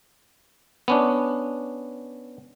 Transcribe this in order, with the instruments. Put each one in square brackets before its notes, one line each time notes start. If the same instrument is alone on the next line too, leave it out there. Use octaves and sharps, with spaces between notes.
[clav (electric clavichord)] B3 C#4 D4